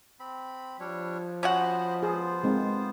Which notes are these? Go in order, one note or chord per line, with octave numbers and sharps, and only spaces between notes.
C4 B5
F3 G3 D4 C#5
C#4 F#4 C5 D#5 F#5 B5
B3 F4 G#4 C5
G#3 C4 D#4